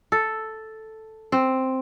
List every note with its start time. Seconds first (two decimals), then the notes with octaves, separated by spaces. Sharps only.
0.12 A4
1.32 C4